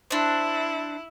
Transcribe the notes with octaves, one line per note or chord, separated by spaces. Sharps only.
D4 E4 C5